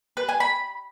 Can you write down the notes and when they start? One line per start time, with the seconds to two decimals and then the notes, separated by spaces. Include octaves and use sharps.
0.17 B4
0.29 G#5
0.40 B5